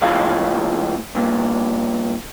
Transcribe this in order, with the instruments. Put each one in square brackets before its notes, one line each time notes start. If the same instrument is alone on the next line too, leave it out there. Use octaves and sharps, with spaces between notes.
[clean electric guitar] C#2 A2 F3 G#4 F5
G2 A#2